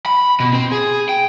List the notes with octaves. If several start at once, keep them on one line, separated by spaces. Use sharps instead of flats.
B5
B2
C4
G#4
G5